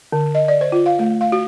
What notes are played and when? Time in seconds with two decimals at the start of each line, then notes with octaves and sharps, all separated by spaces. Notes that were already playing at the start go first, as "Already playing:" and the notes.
0.12 D3
0.35 D#5
0.48 D5
0.61 C5
0.72 F4
0.86 F5
0.99 A3
1.21 F5
1.32 F#4